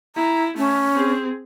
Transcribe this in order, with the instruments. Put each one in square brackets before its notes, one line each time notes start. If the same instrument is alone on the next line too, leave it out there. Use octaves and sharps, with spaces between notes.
[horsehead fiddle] E4 [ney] A#5
[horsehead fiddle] A3 [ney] C#4
[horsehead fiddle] C4 G#4